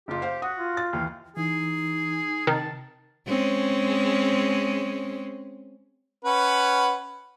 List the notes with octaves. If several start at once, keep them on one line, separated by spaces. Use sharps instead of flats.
F#1 F4 G4
C5 F5
F#4 F#5 D#6
F4
A6
D#2 E3 F5
E3 D#4 G#4
C3 D#3 A5
G#3 C4 C#4
C#4 B4 F#5